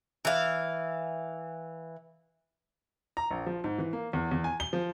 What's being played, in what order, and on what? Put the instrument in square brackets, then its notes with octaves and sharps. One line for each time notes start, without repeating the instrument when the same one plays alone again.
[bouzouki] E3 F5
[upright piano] A#5
A#1
F3
G#2
E3
A#3
E2
E2
G#5
G7
F3